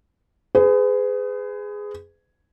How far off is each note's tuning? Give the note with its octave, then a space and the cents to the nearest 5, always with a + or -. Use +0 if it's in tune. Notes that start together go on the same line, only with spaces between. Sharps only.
G#4 +0 B4 +40